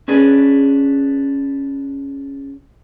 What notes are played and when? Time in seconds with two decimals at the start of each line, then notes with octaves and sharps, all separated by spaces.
0.08 C#4 D4 G#4 B4